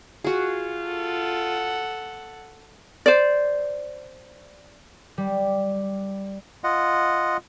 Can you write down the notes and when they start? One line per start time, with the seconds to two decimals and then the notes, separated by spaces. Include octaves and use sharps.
0.24 F4 F#4 G#4
0.90 A4 F#5
3.06 C5 D5
5.18 G3
6.64 F4 D#5 F#5